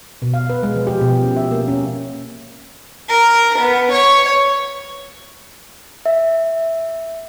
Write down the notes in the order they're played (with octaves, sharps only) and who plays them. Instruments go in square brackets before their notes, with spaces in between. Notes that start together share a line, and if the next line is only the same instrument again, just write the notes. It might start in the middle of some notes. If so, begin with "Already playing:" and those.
[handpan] B2
F5
B4
G#3
F3
G4
B2
C#4
E5
A#3
C#4
[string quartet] A#4
B3
C#5
[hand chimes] E5